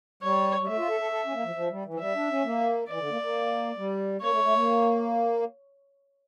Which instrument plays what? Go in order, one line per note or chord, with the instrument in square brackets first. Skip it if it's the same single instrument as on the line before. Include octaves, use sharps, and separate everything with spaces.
[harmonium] G3 [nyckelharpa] C#5
[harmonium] G3
[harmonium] A3 [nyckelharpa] E5
[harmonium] F4
A4
A4
A4
C#4
A#3
F3
F3
G3
E3
F3
[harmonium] G3 [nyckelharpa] E5
[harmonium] D4
C#4
A#3
[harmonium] E3 [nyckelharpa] D5
[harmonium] D3
A#3
A#3
G3
[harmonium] A#3 [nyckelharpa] C#5
[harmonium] A3
A3
A#3